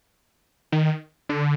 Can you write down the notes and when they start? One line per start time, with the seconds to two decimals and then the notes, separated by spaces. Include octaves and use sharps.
0.72 D#3
1.29 D3